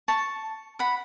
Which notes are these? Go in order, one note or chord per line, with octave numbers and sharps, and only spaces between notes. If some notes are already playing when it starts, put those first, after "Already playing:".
A5 C#6
F#5 B5